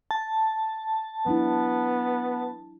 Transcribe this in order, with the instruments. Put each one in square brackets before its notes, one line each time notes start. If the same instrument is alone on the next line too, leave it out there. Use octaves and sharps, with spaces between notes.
[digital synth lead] A5
[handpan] F#3 D4 E4 [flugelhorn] B3